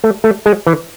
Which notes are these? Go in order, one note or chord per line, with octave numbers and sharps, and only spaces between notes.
A3
A3
G#3
E3